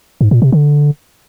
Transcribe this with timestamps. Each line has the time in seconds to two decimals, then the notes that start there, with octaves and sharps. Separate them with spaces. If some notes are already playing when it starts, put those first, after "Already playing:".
0.21 G#2
0.31 A#2
0.42 C3
0.52 D3